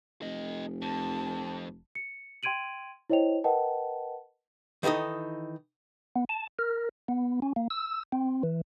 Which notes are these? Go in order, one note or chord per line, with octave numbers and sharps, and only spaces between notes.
F1 A4 D#5
F2 A5
C#7
G5 C6 G#6 D7 D#7 F#7
E4 C5 C#5 D#5 G5 F7
A#4 B4 D#5 F#5 G5 A5
D#3 E3 D#4 A4 D#5
B3
A5
A#4
B3
C#4
A#3
E6
C4
E3